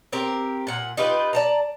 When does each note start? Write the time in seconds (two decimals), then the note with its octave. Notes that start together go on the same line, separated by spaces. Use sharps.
0.13 C4 G4 A#4
0.67 A#2 F#5
0.97 D#4 F4 G4 B4
1.33 D5 A5 A#5